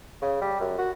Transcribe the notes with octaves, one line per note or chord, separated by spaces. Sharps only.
C#3
G3
F#2
F#4